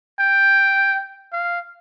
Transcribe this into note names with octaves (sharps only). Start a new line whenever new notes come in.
G5
F5